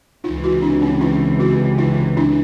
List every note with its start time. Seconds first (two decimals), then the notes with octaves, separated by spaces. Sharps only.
0.24 C#2 C3 E3 D#4 F4
0.44 E4 F#4
0.62 D4 E4
0.82 C#4 D#4
1.01 D#4 F4
1.40 E4 F#4
1.78 D#4 F4
2.17 D4 E4